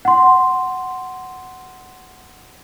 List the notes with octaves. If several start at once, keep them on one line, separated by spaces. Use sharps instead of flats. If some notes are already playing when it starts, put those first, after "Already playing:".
F#5 C6